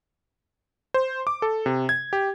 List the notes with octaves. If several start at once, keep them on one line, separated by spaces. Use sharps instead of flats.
C5
D6
A4
C3
G#6
G4